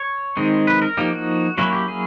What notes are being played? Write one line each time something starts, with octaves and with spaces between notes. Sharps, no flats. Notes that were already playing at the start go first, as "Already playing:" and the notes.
Already playing: C#5
D#3 G#3 C4 D#4
B4
A#4
F3 A#3 D#4 G4
F#4
F#3 A#3 C#4 E4 F#4
G4
G#4